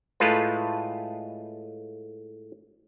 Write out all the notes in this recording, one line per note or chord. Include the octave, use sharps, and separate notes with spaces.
A2 G#3 A3 F4 B4